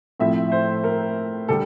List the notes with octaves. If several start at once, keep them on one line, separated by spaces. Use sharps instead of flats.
A2 F3 C4 E4 E5
C5
A#4
D3 G3 A4